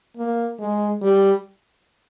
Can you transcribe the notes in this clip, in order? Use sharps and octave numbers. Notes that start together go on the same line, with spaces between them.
A#3
G#3
G3